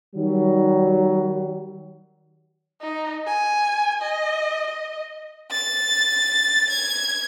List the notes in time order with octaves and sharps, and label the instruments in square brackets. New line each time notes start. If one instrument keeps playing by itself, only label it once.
[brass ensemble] D#3 F#3 G3
[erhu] D#4
G#5
D#5
D#5
[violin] A6
G#6